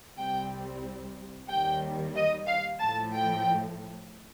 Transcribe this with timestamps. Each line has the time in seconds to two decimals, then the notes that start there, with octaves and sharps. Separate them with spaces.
0.18 C2 C3 G3 C4 G5
1.48 D#2 D#3 G3 G5
2.15 D#5
2.47 F5
2.79 A2 F3 A3 A5
3.13 G5